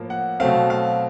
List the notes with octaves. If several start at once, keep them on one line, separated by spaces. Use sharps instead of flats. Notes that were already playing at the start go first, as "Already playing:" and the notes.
Already playing: A2 F3 A#3
F#5
B2 F#3 A3 C4 F5
F5